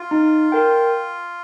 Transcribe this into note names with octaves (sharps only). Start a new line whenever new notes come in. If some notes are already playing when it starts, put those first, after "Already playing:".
Already playing: F4
D#4
A#4 G5